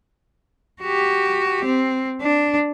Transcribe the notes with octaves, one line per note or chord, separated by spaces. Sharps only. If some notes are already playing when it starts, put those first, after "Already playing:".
F#4 G4
C4
D4